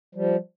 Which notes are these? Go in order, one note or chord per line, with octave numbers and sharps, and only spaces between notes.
F3 G3